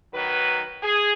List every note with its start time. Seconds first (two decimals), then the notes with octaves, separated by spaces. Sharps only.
0.14 D#3 F#3 B4
0.83 G#4